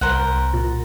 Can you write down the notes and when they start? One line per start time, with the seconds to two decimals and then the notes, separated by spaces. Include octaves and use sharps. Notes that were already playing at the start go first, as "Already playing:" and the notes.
0.01 C2 A#4 C5 F#5
0.54 A#2